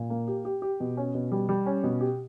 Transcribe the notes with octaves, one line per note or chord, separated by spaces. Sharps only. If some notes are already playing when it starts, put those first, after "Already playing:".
Already playing: A#2
A#3
G4
G4
G4
B2
C#4
B2
G3
G3
C#4
B2
G4